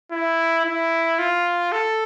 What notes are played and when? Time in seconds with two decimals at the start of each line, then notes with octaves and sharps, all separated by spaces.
0.12 E4
0.65 E4
1.19 F4
1.72 A4